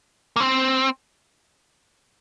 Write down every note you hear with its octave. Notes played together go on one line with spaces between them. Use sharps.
A#3
C4